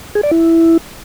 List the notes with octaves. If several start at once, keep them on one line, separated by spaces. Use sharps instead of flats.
G#4
D5
E4